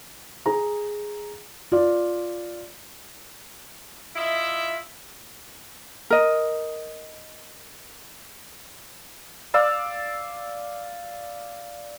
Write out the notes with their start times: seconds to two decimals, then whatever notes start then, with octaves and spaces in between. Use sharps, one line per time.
0.46 G#4 A#5
1.72 F4 D5
4.15 E4 F4 D#5 E5
6.10 A#4 D#5
9.54 D5 F5 E6